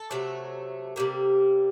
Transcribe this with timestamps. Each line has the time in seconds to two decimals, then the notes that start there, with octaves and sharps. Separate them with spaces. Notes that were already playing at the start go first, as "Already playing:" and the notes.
Already playing: A4
0.11 C3 F#3 A3
0.96 C3 G3 A#3